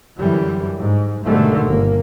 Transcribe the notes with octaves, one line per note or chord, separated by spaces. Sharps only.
F#2 D3 E3 G3
G#2
G#2 B2 D3 D#3 G3 A3
G1 A#3